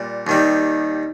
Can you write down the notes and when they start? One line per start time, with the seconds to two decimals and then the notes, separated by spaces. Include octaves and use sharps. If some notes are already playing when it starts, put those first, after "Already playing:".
Already playing: A#2 G3
0.27 D#2 D#3 G3